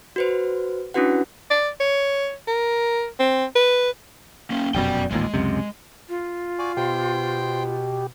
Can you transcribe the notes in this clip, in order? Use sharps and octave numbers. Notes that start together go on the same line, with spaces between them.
F#4 B4 C5
C#4 D4 E4 F#4 B4 F#5
D5
C#5
A#4
C4
B4
A#3 C#4
F1 F#2 B2 D5 G5
A1 D#2 A#2 G#3
C#2 F#2 C3
F4
F#4 D5 G#5
B2 G4 C5 G5